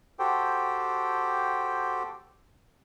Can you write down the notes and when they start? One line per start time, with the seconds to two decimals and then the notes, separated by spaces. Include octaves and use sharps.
0.19 F#4 G4 A4 C5 G5